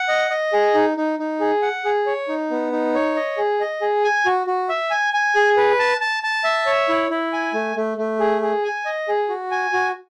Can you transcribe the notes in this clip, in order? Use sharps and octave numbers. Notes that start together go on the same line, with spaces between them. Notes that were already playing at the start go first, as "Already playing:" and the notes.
Already playing: F#5
D#5
D#5
G#4
D#4
D#4
D#4
G#4
F#5
G#4
C#5
D#4
B3
D#4
C#5
D#5
G#4
D#5
G#4
G#5
F#4
F#4
E5
G#5
G#5
G#4
B4
A5
A5
A5
E5
C#5
E4
E4
G#5
A3
A3
A3
G#4
G#4
G#5
D#5
G#4
F#4
G#5
F#4